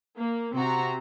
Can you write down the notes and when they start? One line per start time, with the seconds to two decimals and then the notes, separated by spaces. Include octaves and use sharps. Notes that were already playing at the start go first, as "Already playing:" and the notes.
0.17 A#3
0.55 C3 C4 F#4 A#5